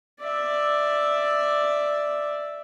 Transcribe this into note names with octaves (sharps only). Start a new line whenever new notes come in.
D5 E5